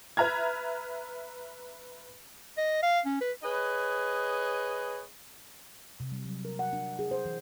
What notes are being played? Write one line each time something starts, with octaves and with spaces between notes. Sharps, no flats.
B4 E5 A#5 F6 G#6
D#5
F5
C#4
B4
G#4 B4 C#5 D#5
C3
G3
F#3
A#4
F#5
D4
G#4
C5
E3